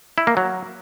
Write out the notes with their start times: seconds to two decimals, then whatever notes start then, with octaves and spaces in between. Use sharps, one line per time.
0.18 E4
0.27 A#3
0.37 F#3